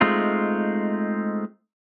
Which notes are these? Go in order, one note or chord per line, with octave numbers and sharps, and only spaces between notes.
G#3 A3 C4 D#4 F4